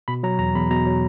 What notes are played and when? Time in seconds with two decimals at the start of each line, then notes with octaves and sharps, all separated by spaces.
0.08 B2 B5
0.23 F#3 A#5
0.39 E2 A#5
0.54 E2 B5
0.71 B2 A#5
0.86 F#3